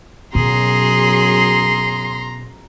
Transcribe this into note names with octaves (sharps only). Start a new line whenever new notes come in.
F#2 B2 F#3 G#4 A#5 C6